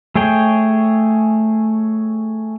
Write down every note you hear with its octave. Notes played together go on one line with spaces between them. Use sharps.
A3 G#4 C#5 G5